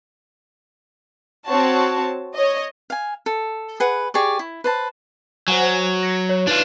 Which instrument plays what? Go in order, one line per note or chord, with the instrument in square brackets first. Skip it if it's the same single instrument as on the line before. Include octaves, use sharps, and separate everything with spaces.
[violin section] C4 F#4 C#5 A5
C#5 D#5
[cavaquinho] F5 G#5
A4
G#4 B4 F#5
G4 G#4 D5 C#6
E4
B4 C5 A5
[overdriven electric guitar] F#3 [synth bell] C5 F#5 G#5
[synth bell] A#6 C#7
C#5
[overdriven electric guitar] D4 F4 [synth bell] D#4 B4